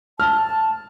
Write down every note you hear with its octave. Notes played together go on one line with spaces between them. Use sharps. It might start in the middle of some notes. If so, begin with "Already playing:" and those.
A5 F6
A5